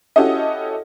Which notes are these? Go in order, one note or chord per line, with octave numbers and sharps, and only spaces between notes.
C#4 E4 F#4 G4 A4 D#5